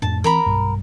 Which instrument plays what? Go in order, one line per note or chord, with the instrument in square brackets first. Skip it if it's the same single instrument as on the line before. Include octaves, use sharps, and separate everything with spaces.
[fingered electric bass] F2 A2 D4 [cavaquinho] A5
[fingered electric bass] E3 C4 [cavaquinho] A#4 A#5 B5
[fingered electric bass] B1 G2